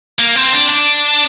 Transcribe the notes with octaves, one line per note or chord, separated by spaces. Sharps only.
A#3
C4
D4
D4